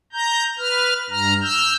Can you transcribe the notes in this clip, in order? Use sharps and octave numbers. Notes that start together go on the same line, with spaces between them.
A#5 G6
B4 F6
G2 A#5 F6
E6 F6 G6